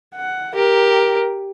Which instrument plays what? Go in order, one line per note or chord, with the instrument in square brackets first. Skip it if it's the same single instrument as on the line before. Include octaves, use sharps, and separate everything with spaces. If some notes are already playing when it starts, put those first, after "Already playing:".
[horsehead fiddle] F#5
[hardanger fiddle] G4 [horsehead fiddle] A#4